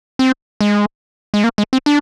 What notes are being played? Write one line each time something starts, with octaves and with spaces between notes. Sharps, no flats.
C4
G#3
G#3
A#3
G#3
C4
D4